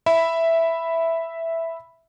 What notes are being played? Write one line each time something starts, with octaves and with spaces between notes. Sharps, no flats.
E5 B5